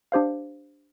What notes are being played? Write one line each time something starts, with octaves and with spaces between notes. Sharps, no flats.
D4 G4 C5 F5